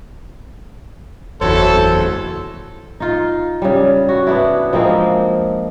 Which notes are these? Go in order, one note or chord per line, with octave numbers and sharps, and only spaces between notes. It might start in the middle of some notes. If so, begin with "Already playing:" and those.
F#1 E2 E4 F#4 A4 C5 C#5
D#4 F4
C#3 G3
F#4
B3 D4 E4
F3 G#3 A#3 C4